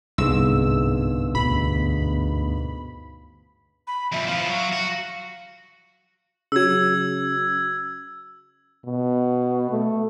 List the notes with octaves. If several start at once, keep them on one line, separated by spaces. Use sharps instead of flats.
G1 C2 G#2 G#4 E6
D2 B2 B5
B5
F2 A#2 E5
F3 E4 F5
F#3 F#4
F#4
C#3 F#3 E6 G#6
B2
A3